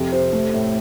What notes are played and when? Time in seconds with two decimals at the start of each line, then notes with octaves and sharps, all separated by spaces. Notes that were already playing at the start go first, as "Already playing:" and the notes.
Already playing: F2 C3
0.12 C3 C5
0.33 A3
0.54 A2